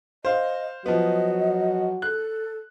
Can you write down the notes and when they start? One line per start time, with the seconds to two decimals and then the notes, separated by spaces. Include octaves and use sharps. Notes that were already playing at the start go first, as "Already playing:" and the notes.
0.25 C5 D#5 F5
0.86 F3 F#3 B3 F#4 D#5
2.02 A4 F#6